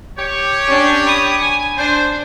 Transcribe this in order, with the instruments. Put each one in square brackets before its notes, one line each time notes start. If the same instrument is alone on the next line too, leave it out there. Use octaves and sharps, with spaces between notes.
[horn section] G4 C#5
[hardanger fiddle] C#4 D4
B5 D#6
G#5
[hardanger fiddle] D4 [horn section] C5